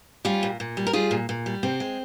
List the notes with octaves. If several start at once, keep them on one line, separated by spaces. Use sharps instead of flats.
G3 C#4 F4
A#2
A#2
G3
A#4
G3 F4 G#4
A#2
A#2
G3
C3 C4
G#3